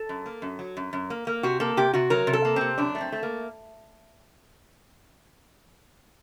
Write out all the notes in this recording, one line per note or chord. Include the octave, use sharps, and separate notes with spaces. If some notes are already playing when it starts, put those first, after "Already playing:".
Already playing: A4
F#2
A#3
F#2
F#3
F#2
F#2
A#3
A#3
C3 F#4
A#3 A4
C3 G4
C3 F#4
F#3 A#4
C3
A4
A#3
C3 C4
F#2 D4
A3
C4
A3
A#3